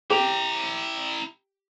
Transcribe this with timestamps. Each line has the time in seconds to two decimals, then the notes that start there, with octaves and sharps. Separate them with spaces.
0.10 E4 G4 A#5